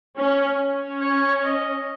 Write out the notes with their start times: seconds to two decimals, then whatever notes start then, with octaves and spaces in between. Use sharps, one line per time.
0.17 C#4
0.59 C#4
1.01 C#5
1.45 D#5